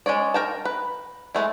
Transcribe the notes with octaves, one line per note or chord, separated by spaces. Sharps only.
G#3 C#4 C#5 D5
A#4 G5 A5
B4
G#3 A3 E4